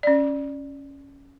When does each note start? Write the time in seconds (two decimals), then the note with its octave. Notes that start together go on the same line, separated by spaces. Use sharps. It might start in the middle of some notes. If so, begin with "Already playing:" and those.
0.03 C#4 D5